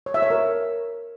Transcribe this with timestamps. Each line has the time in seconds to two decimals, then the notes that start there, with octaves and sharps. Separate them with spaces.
0.06 C#5
0.14 E5
0.22 C#5
0.30 A#4